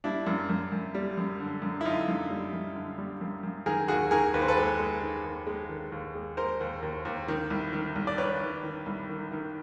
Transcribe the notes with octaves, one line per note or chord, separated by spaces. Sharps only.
G3 D4 E4
F#2
F#2
F#2
G3
F#2
D3
F#2
E4
D3 D#4 F4
F#2
G3
F#2
D3
G3
F#2
F#2
D#3 G#4 A#4
D#2 F#4 G#4
D#3 G#4 A#4
D#2 B4
C5
A4 B4
G#3
G#3
D#3
D#2
G#3
D#3
D#2
G#3
G#3 A#4 C5
D#2
D#2
D#2
D#3
C2
D#3
C2
D5
D#3 B4 C#5
D#3
D#3
C2
D#3
D#3